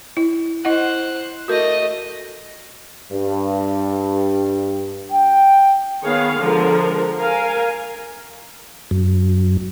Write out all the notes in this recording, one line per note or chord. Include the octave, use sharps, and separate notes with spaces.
E4
E4 C5 D#5 F#5 F#6
A3 F#4 A#4 D#5
G2
G5
D#3 B3 G#4 C#5 F5
D3 F3 G#3 A#4
A#4 F5 G#5
F#2